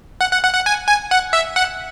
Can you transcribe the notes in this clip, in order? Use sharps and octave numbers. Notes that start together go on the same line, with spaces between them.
F#5
F#5
F#5
F#5
G#5
G#5
F#5
E5
F#5